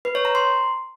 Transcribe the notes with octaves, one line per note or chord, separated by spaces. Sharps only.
B4
C#5
A#5
C6